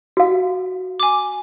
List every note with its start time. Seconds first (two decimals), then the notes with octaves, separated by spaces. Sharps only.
0.17 F#4 F5
1.00 G#5 D6